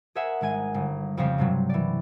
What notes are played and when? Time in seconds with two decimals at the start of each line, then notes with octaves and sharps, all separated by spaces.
0.15 G#4 A#4 C5 E5 F#5 G#5
0.41 G#1 G#3 G#5 D#7
0.74 G1
1.17 F2 C#3 F3 G3 C4
1.38 G2 C3 F#3
1.69 E3 D5